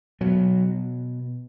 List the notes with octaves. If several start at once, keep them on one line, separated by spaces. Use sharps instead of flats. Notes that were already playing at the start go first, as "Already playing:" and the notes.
B2 F#3